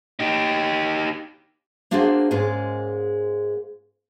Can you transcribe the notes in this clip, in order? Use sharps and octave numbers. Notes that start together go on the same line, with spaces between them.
D#4 G4
A#3 D4 F4 F#4 G#4 C5
G#2 G#3 A#3 C#4 F4 G#4